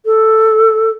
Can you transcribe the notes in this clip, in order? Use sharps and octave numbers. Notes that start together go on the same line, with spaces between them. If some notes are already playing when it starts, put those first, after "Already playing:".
A4